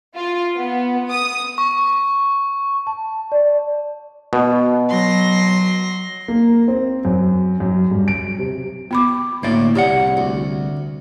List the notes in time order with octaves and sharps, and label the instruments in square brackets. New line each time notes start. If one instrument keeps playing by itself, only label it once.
[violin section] F4
B3
D#6
[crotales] C#6
[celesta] A5
D5
[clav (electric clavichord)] B2
[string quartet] F#3 C6 A#6
[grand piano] A#3
C4
F#2
F#2
G2
D7
C3
[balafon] B3 B5 D6
[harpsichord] D2 A2 [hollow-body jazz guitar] A#3 D5
[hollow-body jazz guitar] C2 F#5 [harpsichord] C#3 [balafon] G4 D5
[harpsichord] D2